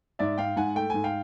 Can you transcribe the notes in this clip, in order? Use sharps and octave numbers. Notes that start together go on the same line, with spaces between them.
G#2 D5 E5
G#2 F5 G5
G#2 F#5 G#5
A3 G5
G#2 G#5
F5 G5